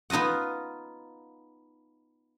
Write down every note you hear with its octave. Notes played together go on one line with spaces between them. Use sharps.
B3 D#4 F4 D#5 F#5